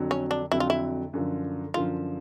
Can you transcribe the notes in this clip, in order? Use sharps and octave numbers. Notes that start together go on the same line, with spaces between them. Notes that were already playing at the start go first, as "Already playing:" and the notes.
Already playing: F2 D3 F#3
C#4
D4
F2 D3 F#3 E4
F4
E4
F#2 D3 F3
F#2 D3 F3 F4